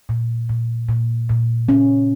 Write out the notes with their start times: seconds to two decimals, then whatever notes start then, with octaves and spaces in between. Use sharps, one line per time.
0.09 A#2
0.49 A#2
0.89 A#2
1.29 A#2
1.69 C#4